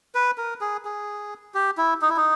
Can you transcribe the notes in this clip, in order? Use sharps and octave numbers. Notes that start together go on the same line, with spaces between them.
B4
A#4
G#4
G#4
G4
E4
D#4
E4
D#4